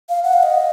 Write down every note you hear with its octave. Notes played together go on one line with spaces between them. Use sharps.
F5
F#5
F5
D#5